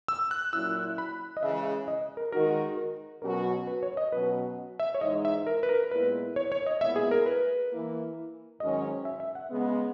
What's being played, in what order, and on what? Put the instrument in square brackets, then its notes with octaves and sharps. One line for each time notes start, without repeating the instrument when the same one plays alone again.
[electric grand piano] E6
F#6
[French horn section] A#2 F#3 C#4 E4 [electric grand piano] E6
[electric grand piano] B5
D#5
[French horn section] C#3 E3 G#3 [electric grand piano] E5
[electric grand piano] D#5
A#4
[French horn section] D#3 G#3 D#4 F#4 [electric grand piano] A#4
[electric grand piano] A#4
[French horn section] B2 F#3 C#4 F#4 [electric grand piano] A#4
[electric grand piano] B4
C#5
D#5
[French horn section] B2 F#3 C#4 F#4 [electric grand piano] B4
[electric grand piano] E5
C#5
[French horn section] G#2 E3 G#3 D#4 [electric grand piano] D#5
[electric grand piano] E5
A#4
B4
A#4
[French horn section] A#2 G#3 B3 E4 [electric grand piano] B4
[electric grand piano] C#5
C#5
D#5
[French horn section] A#2 G#3 B3 E4 [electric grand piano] E5
[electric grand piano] G#4
A#4
B4
[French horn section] E3 A#3 E4
[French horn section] G#2 D#3 F#3 C#4 [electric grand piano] D#5
[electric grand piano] E5
E5
F#5
[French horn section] C#3 G#3 B3